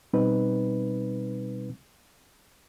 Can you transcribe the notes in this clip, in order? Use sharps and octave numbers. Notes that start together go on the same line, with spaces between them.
B2 G3 C4 D#4 B4